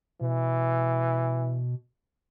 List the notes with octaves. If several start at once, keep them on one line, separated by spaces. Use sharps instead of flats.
B2 E3